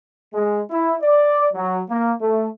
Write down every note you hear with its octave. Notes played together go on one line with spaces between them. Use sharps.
G#3
E4
D5
F#3
A#3
A3